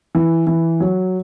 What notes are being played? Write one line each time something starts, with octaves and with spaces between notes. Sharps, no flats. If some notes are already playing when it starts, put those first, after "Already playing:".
E3
E3
F#3